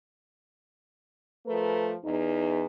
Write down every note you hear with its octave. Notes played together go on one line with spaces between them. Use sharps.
F3 A3 A#4 B4
E2 D#4